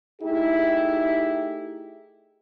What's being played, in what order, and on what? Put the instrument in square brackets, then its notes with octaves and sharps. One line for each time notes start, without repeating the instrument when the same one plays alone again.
[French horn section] A3 D#4 E4 G4 G#4